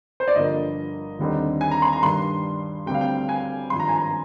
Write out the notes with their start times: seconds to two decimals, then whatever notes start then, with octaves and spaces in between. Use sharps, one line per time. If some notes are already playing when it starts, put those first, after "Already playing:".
0.20 C5
0.28 D5
0.35 G1 G2 D3 F3 A#3 D#5
1.19 D#2 D3 G3 C4 D#4
1.61 G#5
1.71 A#5
1.82 C6
1.93 A#5
2.03 G2 D#3 G3 D4 C6
2.86 D2 C3 G3 C4 G5
2.94 F5
3.01 G5
3.29 G#5
3.70 G#1 G2 F3 C6
3.80 A#5
3.89 G#5
3.98 A#5